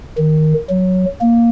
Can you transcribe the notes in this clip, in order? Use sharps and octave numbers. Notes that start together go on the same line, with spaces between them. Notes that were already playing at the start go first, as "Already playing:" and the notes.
D#3
F#3
A#3